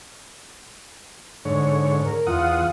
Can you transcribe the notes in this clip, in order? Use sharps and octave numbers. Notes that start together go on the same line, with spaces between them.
G#2 D3 C#5
A#4
E2 F4 F5 F#5 D#6 F6